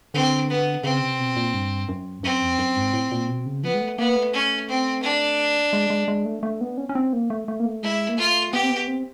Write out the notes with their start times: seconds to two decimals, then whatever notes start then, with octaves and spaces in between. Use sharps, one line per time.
0.14 D3 C4
0.49 B3
0.84 C#3 C4
1.01 C3
1.19 B2
1.36 A#2
1.53 G2
1.89 F#2
2.23 F#2 C4
2.41 F2
2.59 F#2
2.76 G#2
2.93 A2
3.12 A#2
3.29 B2
3.46 C#3
3.63 F3 B3
3.74 G#3
3.81 A3
3.98 A#3 B3
4.16 A3
4.34 C#4
4.69 C4
5.03 D4
5.73 G#3
5.90 G#3
6.08 G#3
6.25 A3
6.43 A3
6.61 B3
6.78 C#4
6.89 C#4
6.95 C4
7.13 A#3
7.30 A3
7.48 A3
7.60 A#3
7.66 A3
7.83 G#3 E4
8.09 A#3
8.18 A3 F4
8.53 B3 G4
8.63 C4
8.70 B3
8.88 C4